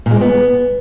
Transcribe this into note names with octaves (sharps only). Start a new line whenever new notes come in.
A#2
G#3
A#2
B3